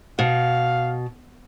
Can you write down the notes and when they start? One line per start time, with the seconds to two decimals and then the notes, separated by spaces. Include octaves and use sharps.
0.19 B2 F5